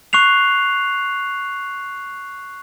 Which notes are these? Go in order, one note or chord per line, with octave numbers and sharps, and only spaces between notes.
C#6 F#6 C7 F7